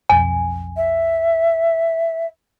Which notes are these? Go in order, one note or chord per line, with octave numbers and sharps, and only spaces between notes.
B1 F2 G#5
E5